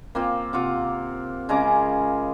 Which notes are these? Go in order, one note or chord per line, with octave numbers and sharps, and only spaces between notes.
A#3 C4 F4
C3 F4 F#5 D6
C#3 G#3 A#5 D6